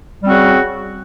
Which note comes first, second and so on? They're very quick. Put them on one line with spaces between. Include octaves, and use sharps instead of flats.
G3 C4 F#4 C#3